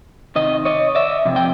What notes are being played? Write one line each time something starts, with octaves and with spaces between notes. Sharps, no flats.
C3 D#3 D#5
C#5 D#5
D5 E5
F2 C3
G5